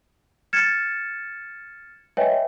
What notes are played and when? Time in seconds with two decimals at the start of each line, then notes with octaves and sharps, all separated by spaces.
0.53 F6 G#6 A6 C#7 E7
2.17 B4 C#5 D#5 E5 G5 G#5